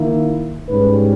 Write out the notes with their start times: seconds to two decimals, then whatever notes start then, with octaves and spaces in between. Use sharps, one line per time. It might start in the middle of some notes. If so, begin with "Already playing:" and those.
Already playing: D#3 A#3 E4
0.69 G#2 G3 C#4 B4